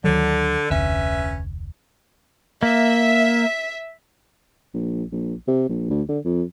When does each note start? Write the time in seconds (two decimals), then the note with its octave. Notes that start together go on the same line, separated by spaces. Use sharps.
0.04 D2 D3 D#3 F#3
0.70 F1 D2 C#4 B4 E5
2.63 A#3 E5
4.74 A#1
5.12 A#1
5.48 C3
5.69 A#1
5.90 D2
6.09 D3
6.25 F2